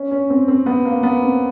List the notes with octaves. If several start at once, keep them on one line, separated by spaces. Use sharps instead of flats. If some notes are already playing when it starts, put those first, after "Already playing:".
Already playing: C#4
C#4
C4
C4
B3
A#3
B3
C4